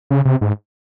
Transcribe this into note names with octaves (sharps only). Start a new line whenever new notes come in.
C#3
C3
G#2